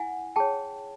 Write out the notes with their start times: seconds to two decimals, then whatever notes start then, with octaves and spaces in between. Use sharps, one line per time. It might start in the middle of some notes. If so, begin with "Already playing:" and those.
Already playing: E4 F#5 G#5
0.36 G#4 C#5 G5 A5